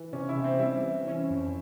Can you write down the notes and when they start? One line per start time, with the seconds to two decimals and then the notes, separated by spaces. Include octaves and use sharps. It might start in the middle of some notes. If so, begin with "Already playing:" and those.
Already playing: E3
0.13 C3 C#4
0.29 E4
0.36 C3
0.44 C4
0.59 G3 E4
0.83 E3
1.07 C#4
1.30 F2